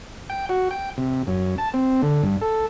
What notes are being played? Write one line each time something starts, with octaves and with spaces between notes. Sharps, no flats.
G5
F#4
G5
C3
F#2
A5
C4
D3
G2
A4